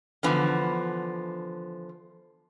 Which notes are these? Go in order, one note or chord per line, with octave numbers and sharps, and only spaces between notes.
D3 E3 F3 B3